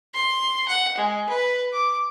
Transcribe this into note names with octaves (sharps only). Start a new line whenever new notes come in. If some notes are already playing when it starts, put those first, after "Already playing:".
C6
F#5
G#3
B4
D6